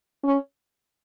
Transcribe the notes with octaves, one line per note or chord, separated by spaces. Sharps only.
C#4